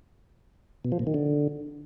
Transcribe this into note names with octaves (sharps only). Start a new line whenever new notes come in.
B2
F3
A#2
D#3
D3